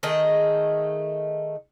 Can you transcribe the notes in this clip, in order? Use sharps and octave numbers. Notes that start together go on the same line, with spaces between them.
D#3 A3 G#4 D#5